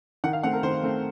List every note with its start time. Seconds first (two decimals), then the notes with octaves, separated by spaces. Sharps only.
0.24 D#3 F#5
0.33 F5
0.43 A3 C4 F#5
0.53 A#4
0.63 D#3 C5
0.83 A3 C4